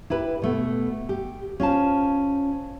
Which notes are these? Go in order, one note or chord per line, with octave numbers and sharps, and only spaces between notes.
E4 G4 B4
B2 A3 B3
G4
C#4 F4 C5 A5